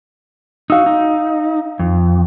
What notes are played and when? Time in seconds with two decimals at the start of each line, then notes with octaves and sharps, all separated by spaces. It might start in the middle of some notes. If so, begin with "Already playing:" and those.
0.70 D#4 F#4 F5 E6
0.86 D#4
1.79 F2